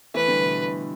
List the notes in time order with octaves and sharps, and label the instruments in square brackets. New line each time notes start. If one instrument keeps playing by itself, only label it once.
[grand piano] E3 A3 [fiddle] B4
[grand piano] D3 G3
B2 E3
B2